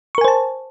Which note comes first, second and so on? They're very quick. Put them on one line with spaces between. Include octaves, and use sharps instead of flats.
C#6 A#4 G#5 C5 A5